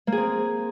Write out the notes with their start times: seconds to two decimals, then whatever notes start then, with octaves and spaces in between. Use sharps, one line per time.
0.07 A#3
0.12 G#4
0.17 C4